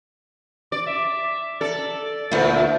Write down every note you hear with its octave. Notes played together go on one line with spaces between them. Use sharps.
D5 D6
E5
A4 D5
D2 A#2 A3 E4